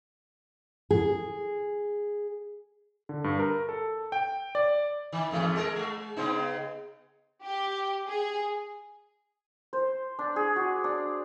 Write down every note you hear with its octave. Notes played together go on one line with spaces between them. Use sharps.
G#4
D3
G2
A#4
A4
G5
D5
D#3
E2 G#2 A3
G#3 A4 A#4
G#3
C#3 B3 D#4
G4
G#4
C5
D4
G#4
F#4
D4